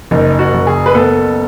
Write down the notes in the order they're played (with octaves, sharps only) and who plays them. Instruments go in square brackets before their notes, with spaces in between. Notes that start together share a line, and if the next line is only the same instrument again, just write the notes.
[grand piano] F#1 [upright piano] D#4
[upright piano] F#4
[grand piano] F#1
[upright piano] G#4
B4
[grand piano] B3 [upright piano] A4